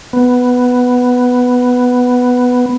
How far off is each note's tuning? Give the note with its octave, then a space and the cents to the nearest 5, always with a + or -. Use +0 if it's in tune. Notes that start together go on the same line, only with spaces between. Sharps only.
B3 +5